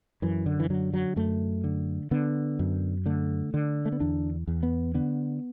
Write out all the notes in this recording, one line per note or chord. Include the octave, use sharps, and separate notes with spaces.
F#2 E3
D3
E3
D3 F#3
F#3
F#2 A3
D3
D3 B3
F#2
D3 A3
D3
A3
B3
E2 D4
E2
B3
D3 B3